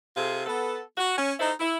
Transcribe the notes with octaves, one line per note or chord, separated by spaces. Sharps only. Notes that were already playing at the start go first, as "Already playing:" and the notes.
C3 F4 G#4 A4
B3 A4
F#4
C#4
D#4 E4 A4 C5 D#5
E4